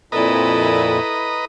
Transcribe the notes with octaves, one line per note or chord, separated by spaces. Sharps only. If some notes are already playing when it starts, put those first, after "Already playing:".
F2 A#2 E4 A4 B4 D#5 A#5